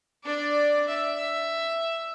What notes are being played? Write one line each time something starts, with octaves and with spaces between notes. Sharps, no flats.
D4 D5
E5